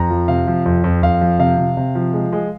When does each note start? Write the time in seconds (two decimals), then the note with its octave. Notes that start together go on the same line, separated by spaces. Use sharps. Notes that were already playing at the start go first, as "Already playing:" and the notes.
Already playing: F2 A#5
0.10 F3
0.28 C3 F5
0.47 F3
0.66 F2
0.84 F2
1.03 F2 F5
1.21 F3
1.39 C3 F5
1.58 C3
1.77 C3
1.95 F3
2.13 G#3
2.33 G#3